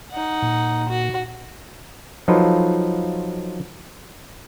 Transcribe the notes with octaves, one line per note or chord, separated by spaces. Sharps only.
D#4 F#5
A#2
F#4
F3 F#3 D#4 F4 A4 B4